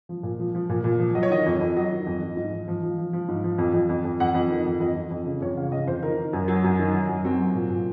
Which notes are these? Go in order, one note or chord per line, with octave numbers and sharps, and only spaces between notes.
F3
A#2
F3
F3
A#2
A#2
F3
F#3 D#5
C#5
D#3 D#5
F2
F2
F#3 D#5
D#3
F2
F2
G#2
F3
F3
F3
F3
F3
G#2
F3
F2
F2
F2
F2
F2 F#5
F2
D#3
F2
F2 D#5
F2
F2
C#3
F2 C#5
C#3 F5
C#3 D#5
F2 C5
D#3 A#4
D#3
F#2
F#3
F#2
D#3
F#3
F#2
F#3 C4
F#3
A#2
A#2